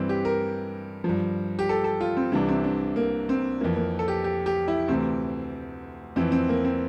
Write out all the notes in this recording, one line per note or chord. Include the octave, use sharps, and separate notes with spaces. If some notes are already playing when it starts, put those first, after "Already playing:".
Already playing: G2 E3 C4
G4
A#4
G2 F3
G4
A4
A4
F4
C4
C2 C3 E3 D4
C4
D4
A#3
C4
F2 E3 A#3
A#3
A4
G4
G4
G4
E4
D2 C3 E3 C4
F2 E3 C4
C4
A#3
C4